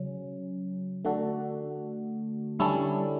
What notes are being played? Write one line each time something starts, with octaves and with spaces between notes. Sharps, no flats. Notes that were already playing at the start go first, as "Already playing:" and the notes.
Already playing: C#3 F#3 C#4
D3 A3 D4 F#4 A4
D3 G3 C#4 E4 A4